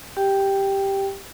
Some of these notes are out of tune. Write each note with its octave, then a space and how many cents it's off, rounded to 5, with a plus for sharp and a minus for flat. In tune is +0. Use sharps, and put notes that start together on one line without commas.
G4 +0 G5 +0